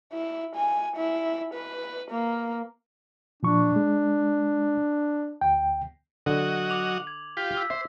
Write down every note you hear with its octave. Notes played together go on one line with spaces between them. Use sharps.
E4
G#5
E4
B4
A#3
A#2 F3 D4 C#6
G#3
D2 G5
D3 F#3 F#4 D#5
D6 F7 F#7
G#6
F4 G4 B6
E6 B6
C5 E5